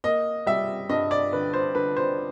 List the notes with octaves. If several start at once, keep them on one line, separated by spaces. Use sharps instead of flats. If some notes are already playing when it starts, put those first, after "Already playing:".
A#3 D#5
G3 E5
G2 D#5
D5
D3 B4
C5
D3 B4
C5